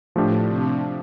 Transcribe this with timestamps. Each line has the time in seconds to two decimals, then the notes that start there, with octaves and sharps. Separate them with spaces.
0.15 A2 F3 A3 D4 G4
0.45 C3